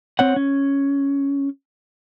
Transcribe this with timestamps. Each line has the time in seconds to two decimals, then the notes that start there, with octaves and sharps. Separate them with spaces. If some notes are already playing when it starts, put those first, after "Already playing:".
0.19 C4 C#5 F#5
0.36 C#4